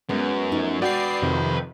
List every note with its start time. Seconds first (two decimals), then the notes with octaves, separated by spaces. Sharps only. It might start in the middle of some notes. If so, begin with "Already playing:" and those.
0.09 F#2 G#3 B3
0.52 F3 A3 D#4
0.82 F#4 B4 D5 G5 C7
1.22 F2 C3 D#3